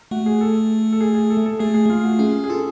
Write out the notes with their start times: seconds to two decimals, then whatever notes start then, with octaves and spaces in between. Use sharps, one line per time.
0.11 A3 F#4
0.26 G#4
0.41 A4
0.92 A4
1.01 G#4
1.15 G#4
1.30 A4
1.46 A4
1.59 A3 G#4
1.74 G#4
1.90 A3 F4
2.05 F#4
2.19 C#4 G#4
2.44 G#4
2.50 F4 A4